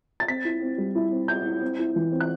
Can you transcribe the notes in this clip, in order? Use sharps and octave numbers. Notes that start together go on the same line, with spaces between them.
A6
C4 B6
E4
C4
G3
E4
C4
C4 G6
E4
C4
E4
E3
C4
F#6